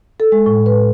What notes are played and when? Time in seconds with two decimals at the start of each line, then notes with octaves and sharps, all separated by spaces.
0.20 A4
0.32 G#3
0.46 A2
0.66 B4